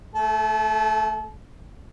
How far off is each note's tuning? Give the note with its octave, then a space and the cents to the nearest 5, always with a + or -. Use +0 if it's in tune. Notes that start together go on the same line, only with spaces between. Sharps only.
A3 +0 A4 -35